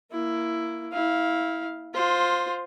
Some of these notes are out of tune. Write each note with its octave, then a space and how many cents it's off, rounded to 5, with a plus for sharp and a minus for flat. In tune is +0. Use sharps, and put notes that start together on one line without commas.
A#3 +0 E4 +15
E4 -20 F5 +0
F4 +15 C5 +0